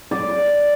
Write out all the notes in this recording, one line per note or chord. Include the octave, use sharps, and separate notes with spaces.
D5